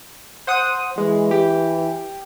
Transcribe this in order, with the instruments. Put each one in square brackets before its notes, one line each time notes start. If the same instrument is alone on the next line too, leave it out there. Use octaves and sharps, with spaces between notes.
[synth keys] C5 F#5 D#6
[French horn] E3 [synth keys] G#3
[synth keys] G4